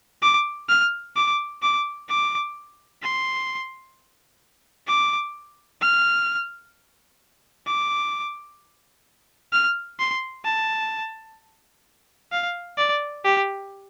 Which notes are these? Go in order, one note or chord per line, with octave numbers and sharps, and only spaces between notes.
D6
F6
D6
D6
D6
C6
D6
F6
D6
F6
C6
A5
F5
D5
G4